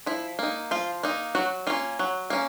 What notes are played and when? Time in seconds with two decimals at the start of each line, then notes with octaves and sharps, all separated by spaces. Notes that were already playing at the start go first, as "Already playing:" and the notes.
0.06 F3 E4
0.39 A#3 D#4
0.71 F3 F4
1.03 A#3 D#4
1.35 F#3 F#4
1.67 A#3 C#4 F4
1.99 F#3
2.30 A#3 C#4